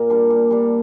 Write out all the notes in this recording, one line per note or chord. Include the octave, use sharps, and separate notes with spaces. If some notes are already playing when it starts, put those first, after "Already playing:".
Already playing: A#2 A#3
G3 D4
A#2
G3 D4